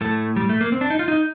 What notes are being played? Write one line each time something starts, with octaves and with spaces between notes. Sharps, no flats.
A2 A3
G3
A3
A#3
C4
D4
D#4
F4
D#4